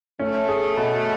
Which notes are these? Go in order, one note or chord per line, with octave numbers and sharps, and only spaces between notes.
A3 C#4
G#4
B2